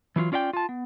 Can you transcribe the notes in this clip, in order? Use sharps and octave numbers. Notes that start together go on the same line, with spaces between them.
E3 F#3 D#4 F4
C#4 F4 D5 E5 G5
F4 A5
B3